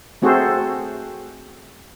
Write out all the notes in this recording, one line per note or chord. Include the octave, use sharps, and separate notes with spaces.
A3 C4 F#4 G#4 A4 C5